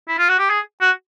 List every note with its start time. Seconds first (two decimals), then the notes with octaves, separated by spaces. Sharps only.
0.08 E4
0.18 F4
0.29 F#4
0.39 G4
0.50 G#4
0.81 F#4